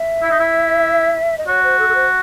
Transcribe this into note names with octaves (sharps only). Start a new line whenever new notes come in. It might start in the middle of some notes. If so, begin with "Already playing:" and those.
Already playing: E5
E4
D#4
E4
D#5
F#4 C#5
C5
A4
A4
C5